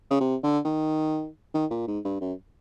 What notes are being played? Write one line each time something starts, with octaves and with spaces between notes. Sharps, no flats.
C#3
C3
D3
D#3
D#3
A#2
G#2
G2
F#2